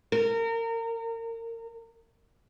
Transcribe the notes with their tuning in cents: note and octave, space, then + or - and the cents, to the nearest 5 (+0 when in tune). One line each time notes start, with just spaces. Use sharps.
A#4 -30